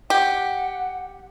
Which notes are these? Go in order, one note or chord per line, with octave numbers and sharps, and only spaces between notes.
G4 F#5